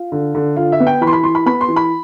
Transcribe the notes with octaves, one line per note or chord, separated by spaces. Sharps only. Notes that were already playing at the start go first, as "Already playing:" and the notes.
Already playing: F4
D3
D3
D3 F4
E5
B3
G5
E3 B5
C6
B5
E3 C6
B5
B3 B5
C6
E3
B5